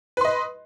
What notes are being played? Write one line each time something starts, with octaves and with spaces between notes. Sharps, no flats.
B4 D#5 C6